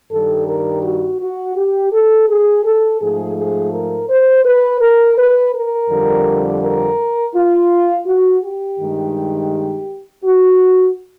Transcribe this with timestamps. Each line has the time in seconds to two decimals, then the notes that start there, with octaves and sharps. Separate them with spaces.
0.11 G2 D#3 G3 A4
0.47 A#4
0.84 F#4
1.21 F#4
1.56 G4
1.93 A4
2.29 G#4
2.64 A4
3.01 G#2 F3 A3 G#4
3.37 G#4
3.73 A#4
4.10 C5
4.45 B4
4.81 A#4
5.18 B4
5.54 A#4
5.90 F2 D3 G3
6.63 A#4
7.35 F4
8.06 F#4
8.43 G4
8.79 G2 D#3 G#3
10.24 F#4